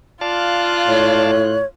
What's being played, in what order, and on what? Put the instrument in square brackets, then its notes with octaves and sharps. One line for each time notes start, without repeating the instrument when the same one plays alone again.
[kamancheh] F4 F#6 [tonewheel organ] D5 F5 A5
[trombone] A2 [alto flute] C#5